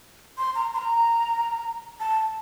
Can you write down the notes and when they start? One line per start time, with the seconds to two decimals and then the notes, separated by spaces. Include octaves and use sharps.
0.38 C6
0.55 A#5
0.74 C6
0.78 A#5
2.00 A5